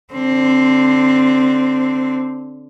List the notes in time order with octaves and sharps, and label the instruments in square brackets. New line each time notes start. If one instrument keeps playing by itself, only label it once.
[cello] D3 C4